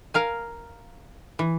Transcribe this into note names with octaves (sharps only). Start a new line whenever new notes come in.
A#4 F5 G#5
E3